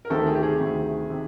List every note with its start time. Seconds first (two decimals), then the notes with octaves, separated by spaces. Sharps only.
0.05 A#4
0.10 D2 C3 D#3 A4
0.26 G#4
0.35 G4
0.43 G#4
0.60 D2 C3 D#3
1.10 C3 D#3